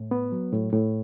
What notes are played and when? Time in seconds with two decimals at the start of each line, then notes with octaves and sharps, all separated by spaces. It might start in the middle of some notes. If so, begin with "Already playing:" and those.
Already playing: A2
0.11 B3
0.32 F#3
0.52 A2
0.73 A2